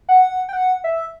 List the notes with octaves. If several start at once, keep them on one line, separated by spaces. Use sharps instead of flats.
F#5
G5
F#5
E5